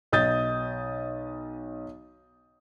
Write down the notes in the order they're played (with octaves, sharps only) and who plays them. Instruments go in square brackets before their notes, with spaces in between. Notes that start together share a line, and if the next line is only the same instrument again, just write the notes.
[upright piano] B1 D#5 D#6 G6 A6